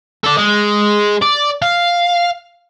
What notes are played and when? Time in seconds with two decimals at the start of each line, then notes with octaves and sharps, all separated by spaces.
0.24 A4 D5
0.37 G#3
1.22 D5
1.62 F5